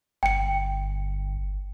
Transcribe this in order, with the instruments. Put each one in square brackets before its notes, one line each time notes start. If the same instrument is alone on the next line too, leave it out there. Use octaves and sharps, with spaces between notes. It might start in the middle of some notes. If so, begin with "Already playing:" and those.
[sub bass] G1 [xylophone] G5 C#7